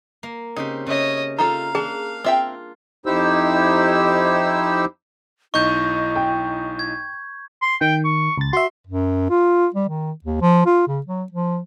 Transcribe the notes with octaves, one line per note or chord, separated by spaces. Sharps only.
A#3
C#3 C4 D#4 G4
C#3 C#5 D#5 E5
D#4 F4 A4 F5 A#5
A#3 D4 G#4 A5
C4 F4 E5 G5
F2 D#4 E4 G4 C5 E6
B1 D#4 E4 D#5 C#6 G6
G5
G#6
C6
D#3 G5
C#6
C#2 A6
F#4 E5 C6
F#2
F4
G3
D#3
D#2
F3
F4
C#3
F#3
F3